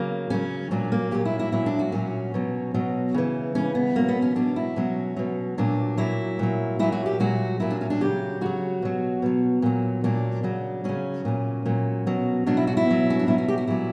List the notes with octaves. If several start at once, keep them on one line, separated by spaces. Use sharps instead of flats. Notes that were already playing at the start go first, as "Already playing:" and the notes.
Already playing: C#3 F#3 A#3
C#3 F#3 C#4
A#2 F#3 D4
A#3
A#2 F#3 G4
E4
E4
A#2 F#3 E4
D4
F#4
A#2 F#3 C#4
B2 F#3
B2 F#3
C#3 E3
C#3 E3 C#4
B3
B2 F#3 A#3
B3
C#4
B2 F#3 D4
E4
B2 F#3 C#4
B2 F#3
A#2 F#3 D4
A#2 F#3 E4
A#2 F#3
A#2 F#3 E4
F#4
G4
A#2 F#3 F#4
A#2 F#3 E4
D4
C#4
D4
C#3 F#3 G4
C#3 F#3 F#4
B2 F#3
B2 F#3
A#2 F#3
A#2 F#3 D4
C#3 F#3
C#3 F#3 C#4
A#2 F#3
A#2 F#3
B2 F#3
B2 F#3 D4
E4
F#4
E4
B2 F#3
C#4
D4
B2 F#3 E4
F#4
G4
F#4
A#2 F#3 E4